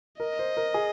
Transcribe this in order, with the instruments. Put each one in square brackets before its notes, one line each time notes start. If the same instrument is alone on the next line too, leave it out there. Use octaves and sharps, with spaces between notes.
[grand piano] A#4 [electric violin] D#5
[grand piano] C5
A#4
G#4